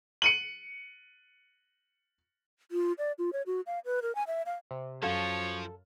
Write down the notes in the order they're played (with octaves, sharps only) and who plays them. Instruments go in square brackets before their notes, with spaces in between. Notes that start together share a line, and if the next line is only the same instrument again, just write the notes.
[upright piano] C#7 D#7 F#7
[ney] F4
D5
F4
C#5
F#4
F5
B4
A#4
G#5
E5
F5
[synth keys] C3
[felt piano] F#2 F5 [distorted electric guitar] F3 [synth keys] A4 [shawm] C#5